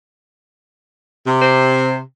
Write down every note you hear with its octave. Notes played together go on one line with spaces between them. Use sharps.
C3
C5